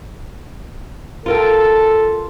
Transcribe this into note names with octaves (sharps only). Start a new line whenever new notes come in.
F4 A4 A#4 G5